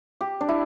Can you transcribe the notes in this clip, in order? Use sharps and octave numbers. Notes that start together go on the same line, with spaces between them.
G4
D4
E4